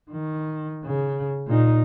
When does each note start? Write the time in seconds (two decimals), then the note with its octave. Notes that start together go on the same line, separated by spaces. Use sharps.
0.11 D#3
0.85 C#3
1.47 A#2 D#4